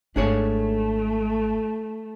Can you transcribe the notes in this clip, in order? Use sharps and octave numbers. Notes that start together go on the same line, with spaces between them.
G#1 A3 D4 G#4 C#5